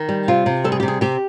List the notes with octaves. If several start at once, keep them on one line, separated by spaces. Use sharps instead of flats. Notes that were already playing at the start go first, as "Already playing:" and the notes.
Already playing: D#3
G3
C3 F4
C3
G3 A4
G#4
G4
C3
G#4
C3 G4